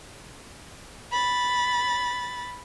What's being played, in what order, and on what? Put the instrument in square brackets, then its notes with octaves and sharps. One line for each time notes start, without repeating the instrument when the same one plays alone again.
[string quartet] B5 A6